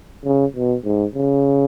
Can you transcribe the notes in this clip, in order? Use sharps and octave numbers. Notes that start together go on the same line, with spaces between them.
C#3
B2
G#2
C#3